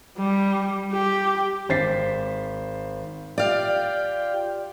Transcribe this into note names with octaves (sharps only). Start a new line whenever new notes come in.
G3
G4
G#1 C5 A6 B6 C7
F4 G4 D5 F5 G5